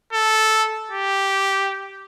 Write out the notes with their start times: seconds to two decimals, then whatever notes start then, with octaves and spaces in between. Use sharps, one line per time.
0.13 A4
0.91 G4